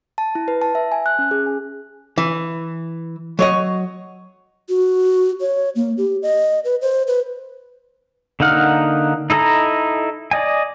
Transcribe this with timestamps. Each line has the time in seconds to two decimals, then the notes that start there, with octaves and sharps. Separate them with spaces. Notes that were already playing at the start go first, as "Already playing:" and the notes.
0.18 A5
0.35 E4
0.48 B4
0.62 A5
0.75 E5
0.92 G#5
1.06 F#6
1.19 C#4
1.31 G#4
1.46 G#5
2.18 E3
3.39 F#3 C#5 D#5
4.69 F#4
5.41 C#5
5.76 A#3
5.98 G4
6.23 D#5
6.65 B4
6.82 C5
7.07 B4
8.40 D3 A#3 D#4 F#5 F6
9.30 D#4 E4 A4 D#5 A#5
10.31 D5 D#5 G#5